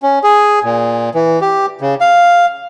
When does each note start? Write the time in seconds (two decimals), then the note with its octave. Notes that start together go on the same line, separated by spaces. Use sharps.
0.03 C#4
0.24 G#4
0.64 A#2
1.15 E3
1.41 G4
1.81 C#3
2.01 F5